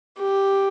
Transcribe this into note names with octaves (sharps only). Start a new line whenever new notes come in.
G4